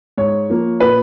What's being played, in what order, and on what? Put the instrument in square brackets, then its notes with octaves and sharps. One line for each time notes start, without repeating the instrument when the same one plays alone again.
[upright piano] G#2 C#5
F3 A#3
A#2 B4